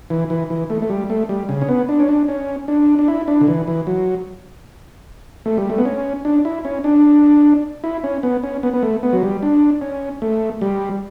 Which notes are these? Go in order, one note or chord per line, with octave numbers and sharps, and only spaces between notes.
E3
E3
E3
A3
A3
G3
A3
G3
C#3
C#4
B3
D4
C#4
D4
C#4
D4
D4
E4
D4
D3
E3
E3
F#3
A3
G3
A3
B3
C#4
D4
E4
C#4
D4
E4
C#4
B3
C#4
B3
B3
A3
B3
F#3
G3
D4
C#4
A3
G3